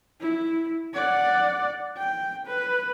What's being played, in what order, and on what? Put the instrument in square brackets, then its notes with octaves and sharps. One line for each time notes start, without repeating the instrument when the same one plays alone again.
[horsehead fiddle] E4
D5 F#5
G5
B4